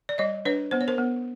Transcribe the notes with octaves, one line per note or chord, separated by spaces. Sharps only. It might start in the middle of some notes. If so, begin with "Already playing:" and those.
D5
G3 C#5 D#5
D4 B4 C#5
B3 C5
C#5
A#4 C5
B3